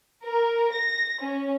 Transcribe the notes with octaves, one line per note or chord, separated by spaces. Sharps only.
A#4
A#6
C#4